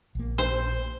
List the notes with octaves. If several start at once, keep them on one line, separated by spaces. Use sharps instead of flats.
A#1 A#3
C5